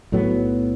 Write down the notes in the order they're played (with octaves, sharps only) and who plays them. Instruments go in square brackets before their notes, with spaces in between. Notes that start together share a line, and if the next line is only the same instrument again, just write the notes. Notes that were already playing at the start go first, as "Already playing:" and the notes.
[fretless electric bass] B1 A2 F#3 B3